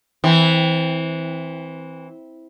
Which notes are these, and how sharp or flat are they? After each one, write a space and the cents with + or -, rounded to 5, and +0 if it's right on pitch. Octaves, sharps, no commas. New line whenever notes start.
E3 -15 C4 +0